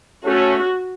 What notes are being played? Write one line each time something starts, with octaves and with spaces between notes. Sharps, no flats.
A3 C#4 F#4